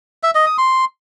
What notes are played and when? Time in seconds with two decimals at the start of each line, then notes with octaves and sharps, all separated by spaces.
0.23 E5
0.35 D#5
0.46 D#6
0.58 C6